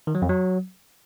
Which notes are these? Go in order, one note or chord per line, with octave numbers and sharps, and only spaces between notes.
D#3
F#3
F2
F#3